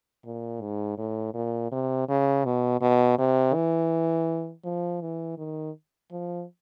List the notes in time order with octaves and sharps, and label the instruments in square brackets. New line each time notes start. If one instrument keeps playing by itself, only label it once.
[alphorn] A#2
G#2
A2
A#2
C3
C#3
B2
B2
C3
E3
F3
E3
D#3
F3